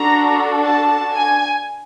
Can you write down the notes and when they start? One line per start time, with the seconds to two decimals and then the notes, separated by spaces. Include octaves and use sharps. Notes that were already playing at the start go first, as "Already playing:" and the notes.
Already playing: D4 F#4 A4 A#5
0.64 A5
1.12 G#5